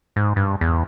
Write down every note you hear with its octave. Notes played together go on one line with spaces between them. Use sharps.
G#2
G2
E2